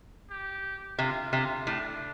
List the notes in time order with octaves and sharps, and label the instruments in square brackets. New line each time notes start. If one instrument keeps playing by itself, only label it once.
[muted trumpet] G4
[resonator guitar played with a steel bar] C3 [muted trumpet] F4
[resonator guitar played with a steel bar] C3 [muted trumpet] F4
[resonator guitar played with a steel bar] A2 [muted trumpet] D4